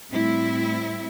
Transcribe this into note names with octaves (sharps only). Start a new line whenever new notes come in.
A2 G3 C4 E4